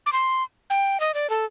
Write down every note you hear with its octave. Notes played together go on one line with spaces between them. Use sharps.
D6
C6
G5
D#5
D5
A4